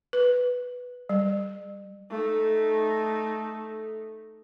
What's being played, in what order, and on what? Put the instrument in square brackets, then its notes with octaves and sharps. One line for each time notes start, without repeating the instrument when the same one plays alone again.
[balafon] B4
G3
[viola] A3 D#4